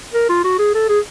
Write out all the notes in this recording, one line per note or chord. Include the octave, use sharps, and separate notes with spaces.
A#4
F4
F#4
G#4
A4
G#4